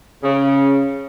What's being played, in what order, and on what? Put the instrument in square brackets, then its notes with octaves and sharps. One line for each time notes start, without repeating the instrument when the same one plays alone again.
[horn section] C#3